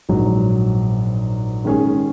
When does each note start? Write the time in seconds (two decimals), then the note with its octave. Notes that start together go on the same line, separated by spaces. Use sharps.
0.09 A#1 G#2 F#3
1.65 D#3 G#3 C#4 G#4